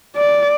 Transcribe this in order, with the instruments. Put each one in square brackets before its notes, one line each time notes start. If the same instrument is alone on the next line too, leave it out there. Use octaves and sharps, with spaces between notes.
[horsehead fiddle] D5